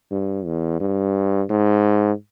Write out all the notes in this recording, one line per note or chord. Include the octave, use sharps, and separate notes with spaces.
G2
E2
G2
G#2